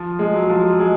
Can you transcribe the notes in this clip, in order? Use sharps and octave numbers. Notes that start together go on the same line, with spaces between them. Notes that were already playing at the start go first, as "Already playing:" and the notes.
Already playing: F3
G#3
F#3
F3
F#3
G#3